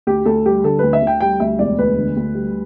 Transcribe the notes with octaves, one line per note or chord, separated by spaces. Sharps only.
D2 G4
D2 A4
G3 G4
D3 A4
D2 B4
E5
D2
G5
G3 G5
D2 E5
E1 D5
D2 B4
D3
D2
G3